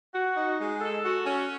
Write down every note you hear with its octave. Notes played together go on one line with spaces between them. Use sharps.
F#4
D#4
G#3
A4
F#4
C#4